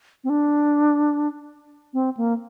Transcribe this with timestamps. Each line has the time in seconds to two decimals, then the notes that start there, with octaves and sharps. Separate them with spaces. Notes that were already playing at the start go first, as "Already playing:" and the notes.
0.24 C4
0.29 D4
1.94 C4
2.17 A#3